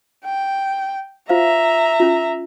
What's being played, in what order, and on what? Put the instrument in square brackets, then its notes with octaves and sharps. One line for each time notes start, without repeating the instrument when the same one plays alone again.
[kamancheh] G5
[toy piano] F4 C5 F5 [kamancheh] E5 A#5
[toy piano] C#4 F4